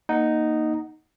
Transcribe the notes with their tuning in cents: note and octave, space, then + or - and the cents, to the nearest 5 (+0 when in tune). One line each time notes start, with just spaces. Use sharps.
A#3 +0 D#4 -5 F#5 +0